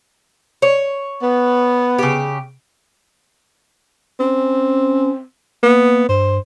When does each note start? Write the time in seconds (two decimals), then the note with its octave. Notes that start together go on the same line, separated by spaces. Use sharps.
0.62 C#5
1.22 B3
1.98 C#3 G4
4.20 C4 C#4
5.63 A#3 B3
6.09 G2 C5